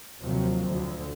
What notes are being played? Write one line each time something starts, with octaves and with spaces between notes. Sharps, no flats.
D#2 C3 F3 F#3
D2 D3